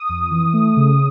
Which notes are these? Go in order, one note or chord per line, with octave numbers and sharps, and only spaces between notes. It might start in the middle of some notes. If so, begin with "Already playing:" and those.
Already playing: D#6
F2
E3
A3
C#3